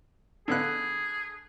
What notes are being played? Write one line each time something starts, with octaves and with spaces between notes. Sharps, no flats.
D3 B3 G#4 F#6